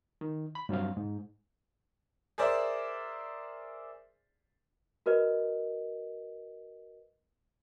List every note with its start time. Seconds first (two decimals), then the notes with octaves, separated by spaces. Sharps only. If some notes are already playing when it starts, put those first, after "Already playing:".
0.21 D#3
0.55 B5
0.69 G2 F#3 C4 F5
0.97 G#2
2.38 G#4 A#4 C5 D5 E5
5.06 F#4 A#4 B4 D#5